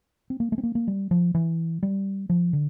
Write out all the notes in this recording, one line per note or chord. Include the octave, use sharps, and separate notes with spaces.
C4
A#3
A3
C4
A#3
A#3
G3
F3
E3
G3
F3
D3